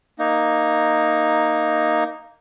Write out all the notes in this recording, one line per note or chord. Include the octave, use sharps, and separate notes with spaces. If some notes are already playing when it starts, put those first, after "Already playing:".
A#3 D#4